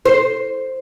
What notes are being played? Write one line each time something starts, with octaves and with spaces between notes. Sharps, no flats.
C5